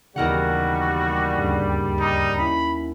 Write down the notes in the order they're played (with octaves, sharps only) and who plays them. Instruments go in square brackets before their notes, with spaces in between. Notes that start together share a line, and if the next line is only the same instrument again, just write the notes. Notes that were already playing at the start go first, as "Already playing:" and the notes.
[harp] D#2 A#4 F#5 [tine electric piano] C#3 E3 B3 [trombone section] G3 [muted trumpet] F#4
[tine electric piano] D2 G2 C#3
[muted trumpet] D#4
[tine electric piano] C#4 E4 [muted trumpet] B5